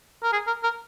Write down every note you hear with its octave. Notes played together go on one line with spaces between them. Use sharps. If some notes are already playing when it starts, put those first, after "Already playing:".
A#4
G#4
A#4
A#4